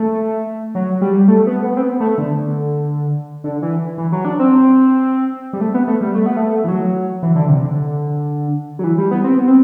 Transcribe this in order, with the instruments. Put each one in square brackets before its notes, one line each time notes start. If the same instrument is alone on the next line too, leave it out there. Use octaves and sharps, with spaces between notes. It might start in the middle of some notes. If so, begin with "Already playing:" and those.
Already playing: [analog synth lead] A3
F#3
G3
A3
B3
B3
C4
B3
A3
D3
D3
E3
E3
F#3
D4
C4
G3
A3
B3
A3
G3
A3
B3
A3
E3
F#3
E3
D3
C3
D3
F#3
E3
G3
B3
C4
B3
C4